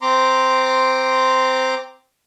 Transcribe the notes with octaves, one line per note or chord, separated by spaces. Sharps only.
C4 A#5 C6 D6